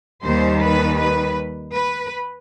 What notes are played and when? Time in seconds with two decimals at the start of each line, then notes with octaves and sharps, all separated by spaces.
0.23 D#2 D#3 G3 C5
0.62 B4
0.98 B4
1.75 B4